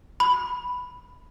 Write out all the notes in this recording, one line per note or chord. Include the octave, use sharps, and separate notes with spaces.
B5